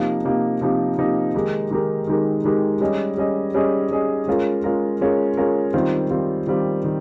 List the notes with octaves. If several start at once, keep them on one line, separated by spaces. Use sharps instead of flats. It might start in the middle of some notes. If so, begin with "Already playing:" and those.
Already playing: C3 F3 A#3 D#4 G4
C3 F3 A#3 D#4 G4
C3 F3 A#3 D#4 G4
C3 F3 A#3 D#4 G4
D#3 G#3 D#4 G4 A#4
D#3 G#3 D#4 G4 A#4
D#3 G#3 D#4 G4 A#4
D#3 G#3 D#4 G4 A#4
G3 C#4 G#4 D#5
G3 C#4 G#4 D#5
G3 C#4 G#4 D#5
G3 C#4 G#4 D#5
G#3 C#4 F4 A#4
G#3 C#4 F4 A#4
G#3 C#4 F4 A#4
G#3 C#4 F4 A#4
D#3 G3 C4 F4
D#3 G3 C4 F4
D#3 G3 C4 F4
D#3